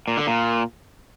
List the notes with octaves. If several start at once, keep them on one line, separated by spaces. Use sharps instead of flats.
A#2
D3
A#2